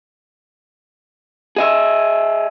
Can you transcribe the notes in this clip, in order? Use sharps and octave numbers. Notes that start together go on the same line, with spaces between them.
G#4 D#5 E5